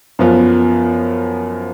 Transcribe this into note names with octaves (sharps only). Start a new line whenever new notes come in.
F#2 F3 B3 F4